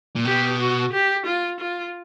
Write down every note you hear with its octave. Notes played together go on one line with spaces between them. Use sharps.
A#2
B2 G4
F#4
G4
F4
F4